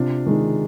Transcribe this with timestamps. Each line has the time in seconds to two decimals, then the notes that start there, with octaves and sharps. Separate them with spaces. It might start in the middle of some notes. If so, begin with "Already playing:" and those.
Already playing: C3 D4 F4
0.26 D#3 G#3